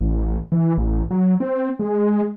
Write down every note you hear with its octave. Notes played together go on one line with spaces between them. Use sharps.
A1
E3
A1
F#3
C4
G#3